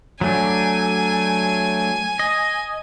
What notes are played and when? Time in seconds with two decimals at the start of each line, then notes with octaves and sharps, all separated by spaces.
0.21 F#3 A3 D4 G#5
2.19 D#5